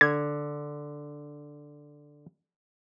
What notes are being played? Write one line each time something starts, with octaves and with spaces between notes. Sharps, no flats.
D3 G#6